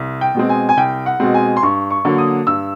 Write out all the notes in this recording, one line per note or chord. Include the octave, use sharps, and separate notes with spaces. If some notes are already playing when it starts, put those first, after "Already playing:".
Already playing: C2
G5
B2 G#3 C4
G#5
G#5
C2 G5
F#5
B2 G#3 C4
G#5
C6
G2 C#6
C#6
D3 F#3 A#3
D#6
G2 E6